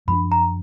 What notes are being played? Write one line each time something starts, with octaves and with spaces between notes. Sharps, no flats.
F#2 F3 B3 D4 B5
A#5